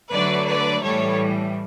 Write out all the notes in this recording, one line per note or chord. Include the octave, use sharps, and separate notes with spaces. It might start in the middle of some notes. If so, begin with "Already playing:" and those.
D3 F#3 A3 B4 D5
B4 D5
A2 E3 G3 A4 C#5